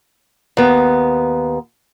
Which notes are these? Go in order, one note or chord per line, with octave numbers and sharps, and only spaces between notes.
D#2 B3